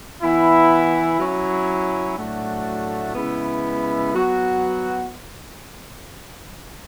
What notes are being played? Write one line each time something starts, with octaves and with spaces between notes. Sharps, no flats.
E3 B3 E4
F#3 C#4 E4
A2 F#3 A3 D4 F#4
C#3 G#3 B3 E4
F#3 B3 F#4